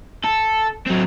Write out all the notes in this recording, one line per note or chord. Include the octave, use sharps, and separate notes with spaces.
A4
F#3 C4